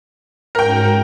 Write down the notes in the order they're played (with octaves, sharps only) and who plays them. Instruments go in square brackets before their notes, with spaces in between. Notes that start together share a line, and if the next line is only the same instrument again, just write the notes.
[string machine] G#2 C#4 F#4 [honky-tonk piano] A#4 G5